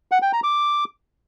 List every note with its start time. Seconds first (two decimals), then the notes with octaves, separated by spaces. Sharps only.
0.12 F#5
0.22 G5
0.33 A#5
0.43 D6